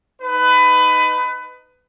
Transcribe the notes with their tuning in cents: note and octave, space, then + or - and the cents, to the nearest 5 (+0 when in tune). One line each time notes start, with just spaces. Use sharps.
D#4 +0 B4 +25